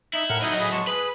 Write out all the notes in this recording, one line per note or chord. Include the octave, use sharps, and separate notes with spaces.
D#4 E4 E5
A2 A#4 F#5 F6
A2 F#3 D#4 E4 D#5
G#4 B5
G#3 A5 C#6
G#4 B4 B5